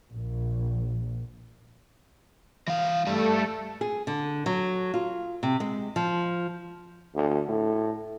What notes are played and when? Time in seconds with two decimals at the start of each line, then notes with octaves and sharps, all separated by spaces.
0.11 A#1
2.68 E3 F5
3.07 G2 G3 A3 A4
3.81 G#4
4.07 D3
4.46 F#3
4.94 F4
5.43 C3
5.60 G#3
5.96 F3
7.15 D2
7.49 A2